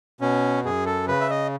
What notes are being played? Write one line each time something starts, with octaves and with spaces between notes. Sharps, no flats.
B2 C#4
F#2 G#4
A4
C#3 B4
E5
D#5